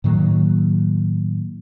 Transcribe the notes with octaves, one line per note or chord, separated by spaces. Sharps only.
A2 D#3 F#3 A#3